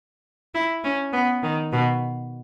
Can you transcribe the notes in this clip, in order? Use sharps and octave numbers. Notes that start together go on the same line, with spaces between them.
E4
C#4
B3
D#3
B2